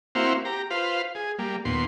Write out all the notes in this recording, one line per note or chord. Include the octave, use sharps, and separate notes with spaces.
A#3 C4 E4 F#4 C5 F5
G4 A#5
F4 B4 C5 F5
G#4
G3 A#3
D#2 A#2 B3 C6